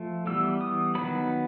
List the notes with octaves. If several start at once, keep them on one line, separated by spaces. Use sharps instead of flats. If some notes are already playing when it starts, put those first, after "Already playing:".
Already playing: F3 A3
E3 G3 B3 E6
D#6
D#3 F#3 B3 B5